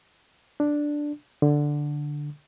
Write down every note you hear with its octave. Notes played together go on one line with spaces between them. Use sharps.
D4
D3